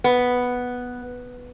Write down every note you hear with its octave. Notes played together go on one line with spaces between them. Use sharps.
B3